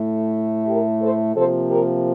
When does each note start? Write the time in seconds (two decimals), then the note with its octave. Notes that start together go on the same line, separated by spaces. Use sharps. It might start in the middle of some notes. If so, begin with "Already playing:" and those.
Already playing: A2 A3
0.67 G4 A#4
1.01 A4 C5
1.35 C3 F3 A#3 A4 C5
1.70 G4 A#4